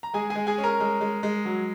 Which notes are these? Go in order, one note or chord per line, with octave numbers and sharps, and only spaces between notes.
A#5
G#3 G#4 G#5
G#4 G#5
G#3
G#4 G#5
C#4
A#4 A#5
G#3
G#3
G#3
F#3